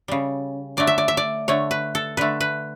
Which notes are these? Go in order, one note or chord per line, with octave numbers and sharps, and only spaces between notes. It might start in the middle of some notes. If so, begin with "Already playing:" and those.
C#3 G3
D3 F#3 A3 D5
E5
D5
E5
D5
D3 A3 C#5
B4
A4
D3 A3 B4
B4